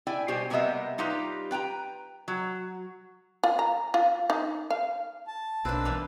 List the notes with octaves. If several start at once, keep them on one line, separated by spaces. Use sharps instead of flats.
E4 D5 G5 G#5
B2 G3 G4 C5 G#5
C3 G3 A#3 B3 D#5 E5
G3 D#4 F4 G4 B4
B4 G5 A5 A#5
F#3
F4
A#5
F4
D#4
F5
A5
B1 A#3 C4 D4 B4 E6
E3 G3